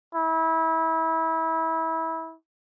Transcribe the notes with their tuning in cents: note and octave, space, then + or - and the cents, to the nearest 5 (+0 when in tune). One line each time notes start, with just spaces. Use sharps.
E4 -25